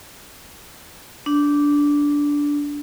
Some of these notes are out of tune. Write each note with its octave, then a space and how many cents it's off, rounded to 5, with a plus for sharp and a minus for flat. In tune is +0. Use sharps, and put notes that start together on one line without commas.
D4 -10